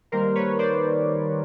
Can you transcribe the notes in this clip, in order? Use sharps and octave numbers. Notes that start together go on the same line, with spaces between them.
D#3 G3 A#3 A#4 C5
B4 C#5
C5 D5